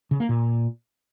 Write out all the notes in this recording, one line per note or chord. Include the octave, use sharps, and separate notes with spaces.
C#3
A#3
A#2